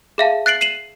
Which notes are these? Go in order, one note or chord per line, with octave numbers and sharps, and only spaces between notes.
G#4 E5 F5 A5
F#6 A6 C7 D7 F#7
C7 D#7 E7 F#7